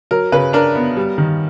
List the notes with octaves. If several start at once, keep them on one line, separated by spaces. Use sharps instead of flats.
F#3 A#4
C#3 B4
D4 A#4
B3
G3
D#3